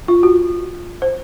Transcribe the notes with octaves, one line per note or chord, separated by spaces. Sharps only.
F4
F#4
C5